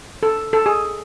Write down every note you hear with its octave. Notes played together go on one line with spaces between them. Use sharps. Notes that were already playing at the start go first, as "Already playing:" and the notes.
A4
A4
G#4